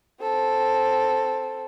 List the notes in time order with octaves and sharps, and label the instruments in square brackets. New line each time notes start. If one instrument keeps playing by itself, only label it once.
[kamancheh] C4 A4